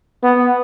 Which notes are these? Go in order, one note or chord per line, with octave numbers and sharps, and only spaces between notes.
B3